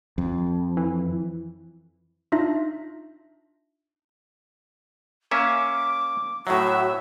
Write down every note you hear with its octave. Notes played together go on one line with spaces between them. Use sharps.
F2
E3
D4 D#4 F4 E5 A#6
A#3 C#4 E5 D6
A2 F#3 F#4 E5